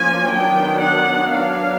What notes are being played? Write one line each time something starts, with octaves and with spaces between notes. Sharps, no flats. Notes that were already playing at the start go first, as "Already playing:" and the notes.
Already playing: F3 A#3 C#4 G#5
D#3 F#3 B3 D4 G5
F#5
F#3 B3 D4 F5